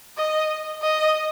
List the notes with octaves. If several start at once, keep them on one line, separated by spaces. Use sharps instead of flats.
D#5
D#5